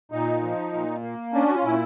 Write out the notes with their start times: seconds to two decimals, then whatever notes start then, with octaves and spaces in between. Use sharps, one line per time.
0.12 A#2 D#4
0.42 F3
0.73 A#2
1.02 A#3
1.33 C#4 D4
1.47 F#4
1.55 F4
1.63 A#2 E4